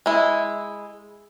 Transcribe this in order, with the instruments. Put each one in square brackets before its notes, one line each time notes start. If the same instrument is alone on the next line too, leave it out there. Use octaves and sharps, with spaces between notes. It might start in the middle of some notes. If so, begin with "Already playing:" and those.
[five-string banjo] G#3 E4